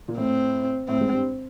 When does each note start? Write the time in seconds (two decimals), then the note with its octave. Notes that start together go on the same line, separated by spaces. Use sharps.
0.08 A#2 A#3
0.17 A2 A3 C4
0.88 A2 A3 C4
1.00 G#2 G#3
1.13 G2 G3